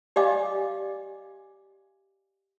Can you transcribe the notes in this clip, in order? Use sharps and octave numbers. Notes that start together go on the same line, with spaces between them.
G4 D5 D#5 F5 G#5 D6